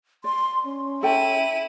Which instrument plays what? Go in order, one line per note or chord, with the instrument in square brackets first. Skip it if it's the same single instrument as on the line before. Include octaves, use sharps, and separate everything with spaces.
[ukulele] D5 [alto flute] C6
[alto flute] C#4
[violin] E4 D#7 [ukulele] A4 G5 A5